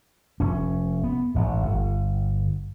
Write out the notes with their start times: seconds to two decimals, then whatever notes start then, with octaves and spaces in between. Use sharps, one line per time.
0.40 F1 C#4
1.04 B3
1.34 A1 G#2
1.63 G1